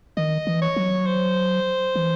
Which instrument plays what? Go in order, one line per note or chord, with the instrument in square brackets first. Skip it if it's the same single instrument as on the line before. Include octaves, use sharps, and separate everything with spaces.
[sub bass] D#3 [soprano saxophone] D#5
[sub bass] E3
[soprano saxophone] C#5
[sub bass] F#3
[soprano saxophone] C5
[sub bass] E3